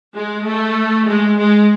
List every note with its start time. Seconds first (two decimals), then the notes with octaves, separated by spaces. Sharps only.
0.15 G#3
0.45 A3
1.07 G#3
1.38 G#3